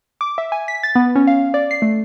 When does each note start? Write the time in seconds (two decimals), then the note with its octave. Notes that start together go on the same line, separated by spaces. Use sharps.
0.21 D6
0.38 E5
0.52 G#5
0.68 B6
0.83 A6
0.95 B3
1.15 C#4
1.27 F5
1.54 D5
1.71 C7
1.82 A3